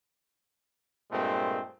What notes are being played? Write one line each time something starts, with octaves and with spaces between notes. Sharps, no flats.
G2 A#2 G#3 A3 C4